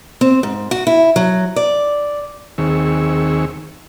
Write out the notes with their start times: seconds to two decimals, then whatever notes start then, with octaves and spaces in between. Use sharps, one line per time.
0.21 C4
0.43 G#2
0.71 F#4
0.87 E4
1.16 F#3
1.56 D5
2.58 D#2 D#3 C4 G#4 C#6 E6